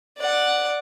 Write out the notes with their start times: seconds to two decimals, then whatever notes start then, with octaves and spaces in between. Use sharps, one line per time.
0.18 D5 F#5